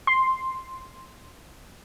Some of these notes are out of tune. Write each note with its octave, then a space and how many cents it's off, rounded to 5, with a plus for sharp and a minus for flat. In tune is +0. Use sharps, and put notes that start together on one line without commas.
C6 +0